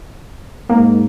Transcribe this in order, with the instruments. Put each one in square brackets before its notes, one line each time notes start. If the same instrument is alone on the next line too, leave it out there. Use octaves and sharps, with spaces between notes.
[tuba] G#2 [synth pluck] A#3